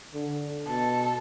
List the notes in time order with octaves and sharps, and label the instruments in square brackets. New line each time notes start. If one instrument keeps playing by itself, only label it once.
[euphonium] D3
[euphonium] B2 [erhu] A4